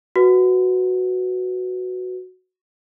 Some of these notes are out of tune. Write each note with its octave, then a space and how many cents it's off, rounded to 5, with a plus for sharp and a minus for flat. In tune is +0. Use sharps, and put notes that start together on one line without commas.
F#4 +0 B4 +0